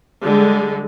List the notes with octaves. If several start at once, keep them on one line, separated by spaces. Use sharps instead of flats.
D3 G3 G#3